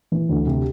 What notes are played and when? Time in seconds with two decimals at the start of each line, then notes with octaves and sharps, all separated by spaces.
0.12 E3
0.29 D2
0.47 C3